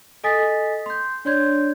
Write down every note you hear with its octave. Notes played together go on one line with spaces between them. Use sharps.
A4 D#5 G#5 D#6 A6 B6
C6 G6
D4 C#5 D5 C6 G6 G#6